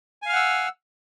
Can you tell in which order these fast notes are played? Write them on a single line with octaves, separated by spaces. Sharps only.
G#5 F5 F6 F#5 E6